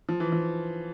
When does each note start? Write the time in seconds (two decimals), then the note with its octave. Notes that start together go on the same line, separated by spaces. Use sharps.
0.09 F3
0.20 E3
0.32 F3